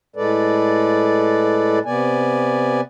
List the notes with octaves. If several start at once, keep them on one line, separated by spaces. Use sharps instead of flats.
A2 G#3 A4 B4 D5
C3 B3 D5 G#5